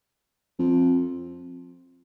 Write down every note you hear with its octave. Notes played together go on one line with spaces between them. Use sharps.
F2